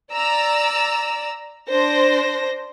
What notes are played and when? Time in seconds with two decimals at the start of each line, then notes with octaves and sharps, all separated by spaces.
0.13 D5 A#5 E6
1.69 D4 C5 A#6